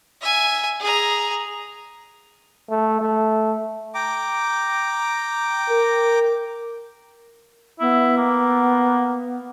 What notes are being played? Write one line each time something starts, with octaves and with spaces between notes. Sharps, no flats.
E5 G#5
G#4 A#5
A3
A3
G5 A#5 D6
A#4
B3 E4
A#3